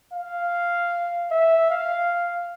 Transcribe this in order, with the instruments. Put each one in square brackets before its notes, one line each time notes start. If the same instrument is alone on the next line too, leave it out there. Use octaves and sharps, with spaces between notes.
[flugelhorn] F5
E5
F5